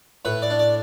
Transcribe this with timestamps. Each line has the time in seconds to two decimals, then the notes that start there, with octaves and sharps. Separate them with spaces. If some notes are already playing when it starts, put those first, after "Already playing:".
0.25 A2 B4
0.42 D5
0.50 D4
0.59 D5